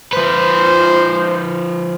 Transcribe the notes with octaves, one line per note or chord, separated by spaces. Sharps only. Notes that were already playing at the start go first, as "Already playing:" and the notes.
F3 B4 C5